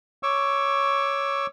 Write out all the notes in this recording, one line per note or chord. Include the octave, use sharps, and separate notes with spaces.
C#5 C#6 D6 E6